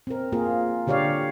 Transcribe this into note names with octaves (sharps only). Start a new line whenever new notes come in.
C4 A#4
A#3 F4 G#4 A#4
D3 G4 C#5 D5 F5